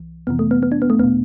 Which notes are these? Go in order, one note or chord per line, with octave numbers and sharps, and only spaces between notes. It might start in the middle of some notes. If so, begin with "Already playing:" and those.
Already playing: C2 E3
F2 C3 E3 B3
A3
B3
B3
D4
B3
A3
E2 B2 B3